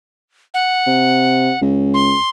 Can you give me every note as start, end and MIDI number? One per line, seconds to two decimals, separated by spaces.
0.54 1.60 78
0.87 1.51 48
1.62 2.15 37
1.94 2.29 84